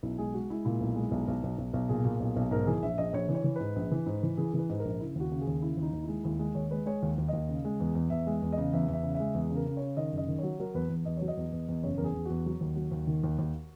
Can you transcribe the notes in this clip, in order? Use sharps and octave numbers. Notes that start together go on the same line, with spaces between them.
B1 E4
G#3 G#4
G#3 F#4
G#3 E4
A#2 E4
B1
G#3
B1
B1
B1
B1
B1
A#2 G#4
A#2
B1
B1
G#2 A#4
E3 G#4
A#1 E5
A#1 D#5
A#1 C#5
E3
C#5
E3
G#2 B4
A#1
E3
G#2
E3
E3 G#4
E3 B4
G#2
A#4
A#1
C#3 E4
D#2 F#4
C#3
G#4
D#2
C#3 E4
D#2
D#4
D#2
E4
G#3
D#2 E4
G#3
D#2 C#5
G#3 B4
G#3 C#5
D#2
D#2
D#2 D#5
C#3
G#3
E2
E2
E2 E5
G#3
E2
D#5
C#3
E2 E5
E2
E5
C#3
E5
G#3
E2 G#4
C#3
A#4
C#3
C#3 C#5
D#3 D#5
F#1 D#5
D#3
F#3 C#5
F#3 A#4
E2 B4
E2
E2 D#5
F#3 C#5
D#5
E2
E2
E2
F#1 C#5
E2 A#4
G#4
E2
E2 F#4
F#3
D#2
F#3
D#2
D#3
D#2
D#2